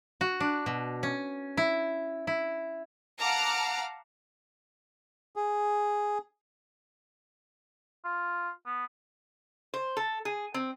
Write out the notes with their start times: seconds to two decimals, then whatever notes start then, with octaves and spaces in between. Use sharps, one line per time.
0.21 F#4
0.40 D4
0.66 B2
1.03 C#4
1.57 E4
2.27 E4
3.20 F5 F#5 A5 A#5 D6 F6
5.36 G#4
8.04 F4
8.66 B3
9.74 C5
9.97 A4
10.25 G#4
10.54 C4